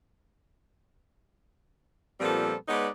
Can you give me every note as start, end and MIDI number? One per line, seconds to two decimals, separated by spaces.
2.20 2.54 46
2.20 2.54 53
2.20 2.54 55
2.20 2.54 59
2.20 2.54 60
2.20 2.54 69
2.69 2.88 56
2.69 2.88 59
2.69 2.88 63
2.69 2.88 71
2.69 2.88 73
2.69 2.88 74